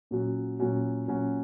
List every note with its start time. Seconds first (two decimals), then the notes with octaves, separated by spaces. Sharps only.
0.11 A#2 F#3 C#4 F#4
0.60 A#2 F#3 C#4 F#4
1.08 A#2 F#3 C#4 F#4